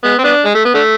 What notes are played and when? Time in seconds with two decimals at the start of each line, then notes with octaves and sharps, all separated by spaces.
0.04 G#3 B3
0.19 C4
0.24 B3 D4
0.45 G#3
0.55 A3
0.65 B3
0.74 D3 A3